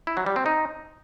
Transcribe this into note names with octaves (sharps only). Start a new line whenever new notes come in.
E4
F#3
G3
C4
D#4